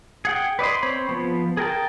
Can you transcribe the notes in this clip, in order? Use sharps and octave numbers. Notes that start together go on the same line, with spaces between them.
G#4 F#5 G5
B4 D5 D#5 C6
C4 C5 C#5 B5
F3 B3
G#4 A#4 G5 A5